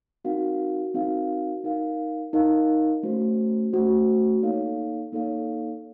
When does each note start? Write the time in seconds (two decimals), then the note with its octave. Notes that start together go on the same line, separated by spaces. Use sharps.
0.25 C4 D#4 F#4 A#4 F5
0.94 C4 D#4 F#4 A#4 F5
1.64 D#4 A#4 F5
2.33 D#4 A#4 F5
3.03 A3 C#4 F#4 C5
3.73 A3 C#4 F#4 C5
4.43 A#3 D#4 A4 C#5 F5
5.12 A#3 D#4 A4 C#5 F5